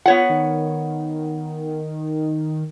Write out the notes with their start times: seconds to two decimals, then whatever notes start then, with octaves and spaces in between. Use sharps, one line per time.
0.06 B3 F4 C#5 F#5
0.29 D#3